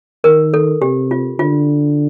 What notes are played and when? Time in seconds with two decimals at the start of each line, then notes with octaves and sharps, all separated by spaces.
0.24 D#3 A#4
0.54 A4
0.82 C3 G4
1.11 F4
1.39 D3 F4